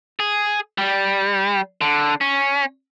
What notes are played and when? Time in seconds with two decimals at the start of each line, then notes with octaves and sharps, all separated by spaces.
0.20 G#4
0.78 G3
1.81 D3
2.21 C#4